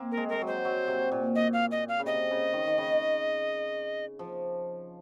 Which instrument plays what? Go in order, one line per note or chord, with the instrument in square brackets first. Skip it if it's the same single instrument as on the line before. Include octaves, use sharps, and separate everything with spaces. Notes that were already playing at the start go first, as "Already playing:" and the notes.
Already playing: [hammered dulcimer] A#3 C4
[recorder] A#4
[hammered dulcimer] G#3
[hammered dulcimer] G#3 [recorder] A#4
[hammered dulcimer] F#3
[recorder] C5
[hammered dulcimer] F#3
C3
A#2
[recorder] D#5
F5
D#5
F5
[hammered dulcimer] C#3
[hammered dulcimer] C3 [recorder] D#5
[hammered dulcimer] C#3
D#3
D#3
C#3
F3